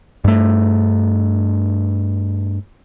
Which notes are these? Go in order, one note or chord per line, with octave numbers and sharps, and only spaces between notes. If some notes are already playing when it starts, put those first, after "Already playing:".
G2 A3